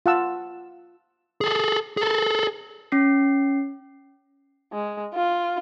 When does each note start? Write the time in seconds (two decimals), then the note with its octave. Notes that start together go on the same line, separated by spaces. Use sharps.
0.06 F4 F5 F#5 A5 E6
1.41 G#4 A4
1.97 G#4 A4
2.92 C#4 C7
4.72 G#3
5.15 F4